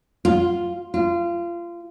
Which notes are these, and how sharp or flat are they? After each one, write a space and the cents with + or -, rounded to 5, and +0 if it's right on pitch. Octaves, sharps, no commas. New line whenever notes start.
F4 -5
F4 -25